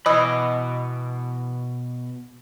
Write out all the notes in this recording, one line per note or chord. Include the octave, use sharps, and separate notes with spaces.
B2 E3 D#5 B5